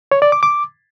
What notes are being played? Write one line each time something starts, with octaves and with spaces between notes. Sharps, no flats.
C#5
D5
D6
D6